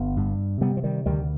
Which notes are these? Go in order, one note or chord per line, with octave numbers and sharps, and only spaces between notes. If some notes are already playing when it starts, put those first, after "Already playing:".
Already playing: G1 G3 B3
G2
C3 G3 B3
F3
D#3 G3
D2 D#3 G3